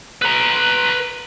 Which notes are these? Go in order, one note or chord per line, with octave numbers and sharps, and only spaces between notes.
B4 A#5